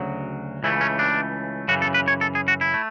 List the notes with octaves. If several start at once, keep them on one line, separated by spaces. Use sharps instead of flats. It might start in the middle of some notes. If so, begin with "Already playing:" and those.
Already playing: D2 C#3 F#3
C#2 C#3 E3 A3 E4
C#4
D4
F#2 C#3 E3 F#4
A4
B4
C#5
A4
G#4
F#4
E4
A3